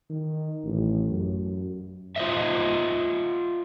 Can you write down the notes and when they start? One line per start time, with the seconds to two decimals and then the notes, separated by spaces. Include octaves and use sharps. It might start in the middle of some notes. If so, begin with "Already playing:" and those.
0.10 D#3
0.65 A1
1.10 F#2
2.16 F4 C5 D#5 E5